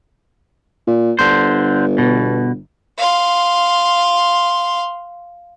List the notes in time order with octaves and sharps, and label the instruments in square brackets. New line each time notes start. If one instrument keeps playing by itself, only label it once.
[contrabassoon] A#2
[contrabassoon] G1 [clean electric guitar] D3 C5
[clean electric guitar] B2
[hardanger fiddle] F5 C6